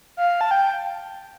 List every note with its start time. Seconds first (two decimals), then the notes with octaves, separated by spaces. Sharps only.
0.17 F5
0.41 A5
0.51 G5